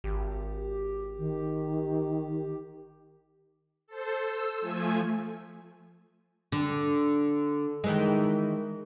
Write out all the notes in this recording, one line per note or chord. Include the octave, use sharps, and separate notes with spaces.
G#1 G4
D#3
A4 C5
E6
F3 A3 G#5
D3
D#3 E3 G#3